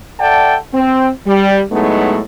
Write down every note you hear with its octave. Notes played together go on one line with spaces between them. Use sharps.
A4 D5 E5 F#5 G5 A5
C4
G3
A2 F#3 G#3 A3 B3 D#4